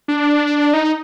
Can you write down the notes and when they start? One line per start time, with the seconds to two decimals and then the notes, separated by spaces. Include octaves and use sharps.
0.08 D4
0.73 D#4